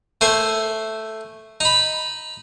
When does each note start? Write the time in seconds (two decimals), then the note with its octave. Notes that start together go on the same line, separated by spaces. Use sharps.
0.21 A3 C5 G#5
1.61 D#4 B5